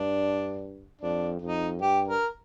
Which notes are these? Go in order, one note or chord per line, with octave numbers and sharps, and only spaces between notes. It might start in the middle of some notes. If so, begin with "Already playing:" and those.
Already playing: G2 D4
F2 D4
F2 D#4
G2 G4
A#4